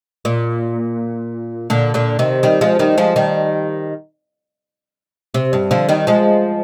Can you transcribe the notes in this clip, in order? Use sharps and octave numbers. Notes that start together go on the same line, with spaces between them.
A#2
A#2 D3
A#2 D3
C3 D#3
D#3 G3
F3 G#3
D#3 G3
F3 G#3
D#3 G3
C3
G2
D3 F3
D#3 G3
F3 G#3